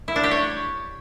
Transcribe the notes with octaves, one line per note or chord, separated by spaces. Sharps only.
E4
D4
G4
C#5